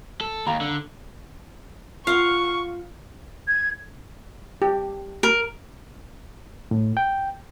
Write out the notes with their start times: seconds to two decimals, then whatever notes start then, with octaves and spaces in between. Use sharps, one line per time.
0.21 A4
0.47 D#2 F5 A#5 B5
0.61 D3
2.07 F4 F5 F#5 C#6
3.48 G#6
4.62 G4
5.23 A#4
6.71 A2
6.97 G5